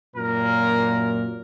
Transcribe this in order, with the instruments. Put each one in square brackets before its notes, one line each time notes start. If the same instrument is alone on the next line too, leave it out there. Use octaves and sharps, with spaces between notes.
[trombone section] F#2 A#2 [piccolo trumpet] A#4